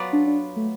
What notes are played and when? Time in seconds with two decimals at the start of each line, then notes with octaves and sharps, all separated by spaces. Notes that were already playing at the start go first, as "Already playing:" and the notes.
Already playing: F#3 B3 F4 B4 D5
0.13 D4
0.27 D4
0.56 A3